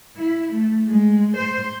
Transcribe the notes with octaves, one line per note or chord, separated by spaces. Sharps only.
E4
A3
G#3
C5